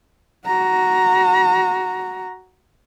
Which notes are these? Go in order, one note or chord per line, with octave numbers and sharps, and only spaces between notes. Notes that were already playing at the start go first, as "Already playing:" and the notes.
F#4 A#5